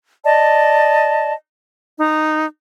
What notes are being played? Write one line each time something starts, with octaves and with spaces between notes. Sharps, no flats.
D5 D#5 A5
D#4